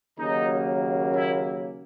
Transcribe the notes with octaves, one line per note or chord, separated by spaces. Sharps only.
D#2 C#3 F#3 A#3 D#4
E4